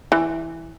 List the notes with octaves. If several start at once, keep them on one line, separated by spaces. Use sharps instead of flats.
E3